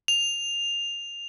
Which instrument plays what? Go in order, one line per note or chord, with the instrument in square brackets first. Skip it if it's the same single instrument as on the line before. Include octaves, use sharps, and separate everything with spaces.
[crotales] F7